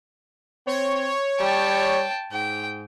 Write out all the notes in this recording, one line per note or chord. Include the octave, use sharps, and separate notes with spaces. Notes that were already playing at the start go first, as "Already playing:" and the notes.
C4 C#5
G3 G5 A5
G#2 G5